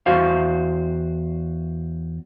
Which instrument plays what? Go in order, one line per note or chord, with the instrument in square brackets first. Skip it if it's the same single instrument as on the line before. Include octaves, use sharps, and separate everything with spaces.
[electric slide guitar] E2 F#4 C5 F5